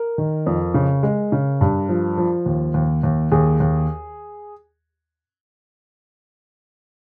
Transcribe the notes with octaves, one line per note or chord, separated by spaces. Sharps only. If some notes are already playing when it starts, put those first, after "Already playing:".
Already playing: A#4
D#3
F2
C#3
G#3
C#3
G2
F3
F3
D#2
D#2
D#2
D#2 G#4
D#2